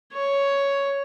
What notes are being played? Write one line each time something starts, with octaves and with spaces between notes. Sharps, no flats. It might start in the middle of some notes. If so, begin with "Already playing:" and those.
C#5